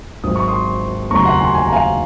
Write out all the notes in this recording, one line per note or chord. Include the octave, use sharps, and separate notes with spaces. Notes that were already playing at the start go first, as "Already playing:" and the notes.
G#1 G#2 F#3 D#6
C#6
C6 D#6
F1 D#2 C#3 F#3 A#5 C#6
C6
F#5 A#5
G#5 C6
G#5
A#5
F5 G#5